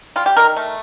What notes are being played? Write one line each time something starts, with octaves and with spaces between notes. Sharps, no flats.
G3 F4
G4
D#3 A#4
A3